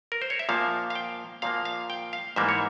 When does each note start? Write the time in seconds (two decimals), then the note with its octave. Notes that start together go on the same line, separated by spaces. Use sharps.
0.12 A#4
0.22 C5
0.30 C#5
0.39 E5
0.49 A#2 F3 A#3 F5
0.90 F5
0.95 G5
1.42 A#2 F3 A#3 F5
1.65 F5
1.90 G5
2.13 F5
2.36 G#2 E3 G3 A#3 E5
2.49 C#5